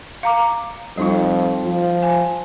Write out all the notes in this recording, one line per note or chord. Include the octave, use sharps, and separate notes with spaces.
F5 A#5 D6
F2 G3 D#4 F4
F3
G#5